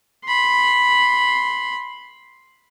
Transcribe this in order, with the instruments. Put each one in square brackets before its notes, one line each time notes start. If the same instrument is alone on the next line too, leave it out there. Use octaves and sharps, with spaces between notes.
[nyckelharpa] B5 C6